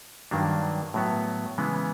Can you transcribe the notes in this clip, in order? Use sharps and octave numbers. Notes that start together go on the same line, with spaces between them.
G2 D#3 F#3 A#3 D4
A2 F#3 B3
C#3 E3 G#3 B3